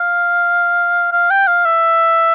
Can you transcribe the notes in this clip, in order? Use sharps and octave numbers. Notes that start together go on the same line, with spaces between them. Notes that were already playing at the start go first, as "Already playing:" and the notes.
Already playing: F5
F5
G5
F5
E5